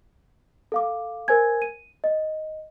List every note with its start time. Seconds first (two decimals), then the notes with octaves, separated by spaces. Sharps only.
0.72 A4 F5 D6
1.28 A#4 C5 G#5 G#6
1.62 D#7
2.04 D#5